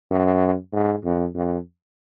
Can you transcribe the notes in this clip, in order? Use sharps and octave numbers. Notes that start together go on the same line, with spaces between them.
F#2
G#2
F2
F2